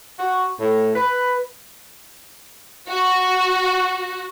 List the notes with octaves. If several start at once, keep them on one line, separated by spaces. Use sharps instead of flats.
F#4
A2
B4
F#4